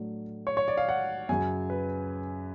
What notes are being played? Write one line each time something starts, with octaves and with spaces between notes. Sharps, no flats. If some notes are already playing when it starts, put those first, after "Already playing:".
Already playing: A2 F#3 A3 D4
C#5
C#5
D5
F5
F#5
F#2 C#3 F#3 G#5
B4